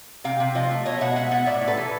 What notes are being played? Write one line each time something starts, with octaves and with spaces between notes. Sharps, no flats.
C3 F5 G5
C3
F3 D#5 F5
A3
B2 C#5 D#5
B2 E5 F#5
G#3 E5 F#5
B3 E5 F#5
A2 D5 E5
A2
A4 B4
E3